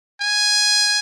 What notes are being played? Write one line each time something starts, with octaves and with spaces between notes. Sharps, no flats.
G#5